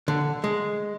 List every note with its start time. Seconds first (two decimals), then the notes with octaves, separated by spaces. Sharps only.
0.08 D3
0.44 G#3